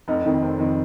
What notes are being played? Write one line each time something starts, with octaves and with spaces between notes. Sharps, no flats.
F1 D#4
F2 D#3 D#4
F1 C4
F2 D#3